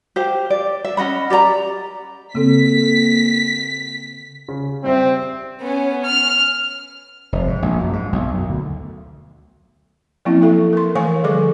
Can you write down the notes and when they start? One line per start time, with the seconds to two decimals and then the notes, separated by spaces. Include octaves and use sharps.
0.16 G4 C5 F5
0.50 D5
0.85 E5
0.97 C#4 D#5 F#5 B5
1.30 G4 D5 D#5 A#5
2.35 C#3 A#3 C4 A4 B6
4.48 C#3
4.84 G3 C4 C5 E5
5.61 B3 C#4
6.05 F6
7.32 F1
7.48 G#2
7.62 A#1
7.79 F#2
7.93 G#2
8.13 B1
8.34 F#2
8.49 D2
10.25 F3 F#3 A#3 C4 C#4 E4
10.42 E4 A4 E5
10.73 A#4 C6
10.95 E3 A3 A#4 F5 G#5 C#6
11.23 D3 F3 G3 G#4 A4 D6